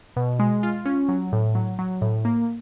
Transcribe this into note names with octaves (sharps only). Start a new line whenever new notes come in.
B2
G#3
F4
C#4
F#3
A2
F#3
F#3
A2
A#3